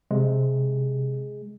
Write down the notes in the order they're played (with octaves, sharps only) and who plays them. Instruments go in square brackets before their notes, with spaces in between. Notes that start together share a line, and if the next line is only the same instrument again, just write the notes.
[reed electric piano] C3 [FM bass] G#3